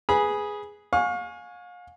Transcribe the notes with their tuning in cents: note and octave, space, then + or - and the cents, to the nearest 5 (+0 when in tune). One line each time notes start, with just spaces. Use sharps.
G#4 +0 B4 +0 B5 -25
F5 +35 G#5 +0 C#6 +0